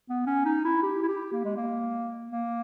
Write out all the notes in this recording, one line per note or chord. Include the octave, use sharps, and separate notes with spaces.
B3
C#4
D#4
E4
G4
E4
G4
A#3
G#3
A#3
A#3